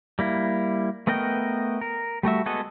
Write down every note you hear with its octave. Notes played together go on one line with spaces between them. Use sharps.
G3 A#3 E4
A3 B3 A#4 D#5 G5
A#4
G3 A3 F#4 E5
G#3 B3 F#4 A4 D#5